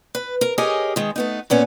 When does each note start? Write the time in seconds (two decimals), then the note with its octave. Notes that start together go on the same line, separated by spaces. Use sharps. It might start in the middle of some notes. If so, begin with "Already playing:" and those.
0.15 B4
0.41 A#4
0.58 G4 G#4 A#4 C#5 D#5 G#5
0.96 D#3 G#3
1.16 A3 B3 D#4
1.50 A#2 B3 C#4